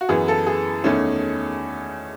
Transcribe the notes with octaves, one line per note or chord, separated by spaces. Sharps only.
F#4
F#2 E3 B3 G#4
A4
G#4
E2 D#3 A3 C#4